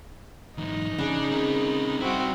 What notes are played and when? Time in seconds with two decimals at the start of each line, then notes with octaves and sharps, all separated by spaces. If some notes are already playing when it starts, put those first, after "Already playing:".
0.58 E2 G#2 D#4
0.99 C#3 D4 G#4
1.31 C4 A#4
2.01 G3 C4 E4 F#4